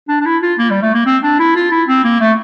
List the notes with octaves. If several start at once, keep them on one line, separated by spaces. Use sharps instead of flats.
D4
D4
E4
F4
A#3
G3
A3
A#3
C4
D4
E4
F4
E4
C4
A#3
A3